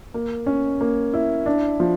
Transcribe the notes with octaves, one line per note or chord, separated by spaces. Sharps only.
A#3
C#4
A#3
E4
D4
F3